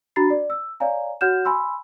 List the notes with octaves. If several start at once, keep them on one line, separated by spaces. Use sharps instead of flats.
D4 F#4 A#5 B5 A6 C7
D5
E6
C#5 D5 F5 G#5 A#5
F#4 C#5 F#5 F6 G6 E7
G#5 B5 C6 E6